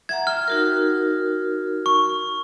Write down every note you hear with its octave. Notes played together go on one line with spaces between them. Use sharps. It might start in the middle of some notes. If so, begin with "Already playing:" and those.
E5 F#5 A#5 G#6
G5 F6
D#4 F#4 A#4
C#6